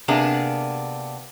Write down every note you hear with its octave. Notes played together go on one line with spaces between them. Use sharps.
C3 A#3 B3 D4 G#4